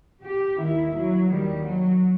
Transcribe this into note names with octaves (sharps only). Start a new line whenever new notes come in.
G4
D#2 D#3 E4
F#3
D#2 D#3 G3
F#3